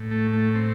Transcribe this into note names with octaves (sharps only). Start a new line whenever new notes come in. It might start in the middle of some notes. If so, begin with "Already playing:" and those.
Already playing: A2
A3
A3
C4